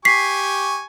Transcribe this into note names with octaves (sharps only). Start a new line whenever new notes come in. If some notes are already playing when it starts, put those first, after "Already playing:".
G4 G#5 C#6 B6 C7